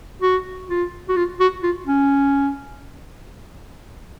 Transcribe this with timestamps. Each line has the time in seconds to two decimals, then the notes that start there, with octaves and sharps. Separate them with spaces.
0.22 F#4
0.69 F4
1.09 F#4
1.17 F4
1.40 F#4
1.63 F4
1.87 C#4